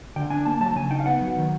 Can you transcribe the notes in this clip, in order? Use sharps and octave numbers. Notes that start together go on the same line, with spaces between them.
D3 G5
D4 G#5
A#3 A5
F#3 A5
C#3 G#5
D#4 G5
F5
B3 F#5
F#3
D#3